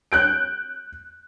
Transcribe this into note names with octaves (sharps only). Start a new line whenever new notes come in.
F#6 G6 D7